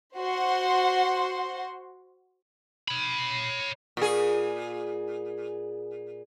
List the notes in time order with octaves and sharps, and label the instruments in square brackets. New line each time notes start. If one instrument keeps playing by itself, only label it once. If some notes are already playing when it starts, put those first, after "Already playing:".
[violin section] F#4 C5 F#5 C6
[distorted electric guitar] C#5 B5
[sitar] A#2 G#4